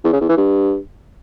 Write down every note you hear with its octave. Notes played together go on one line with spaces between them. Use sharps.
E2
C#3
E2
E3
G2